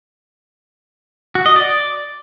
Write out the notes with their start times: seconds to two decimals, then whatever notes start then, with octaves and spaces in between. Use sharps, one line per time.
1.35 F#4
1.46 D#5
1.56 D5